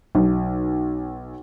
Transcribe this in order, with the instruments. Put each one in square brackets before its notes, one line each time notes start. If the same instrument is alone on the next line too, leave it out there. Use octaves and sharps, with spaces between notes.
[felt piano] B1